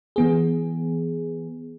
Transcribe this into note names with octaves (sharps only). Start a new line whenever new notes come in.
E3 B3 G#4